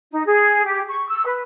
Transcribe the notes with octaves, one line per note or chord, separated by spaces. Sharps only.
D#4
G#4
G4
C#6
E6
B4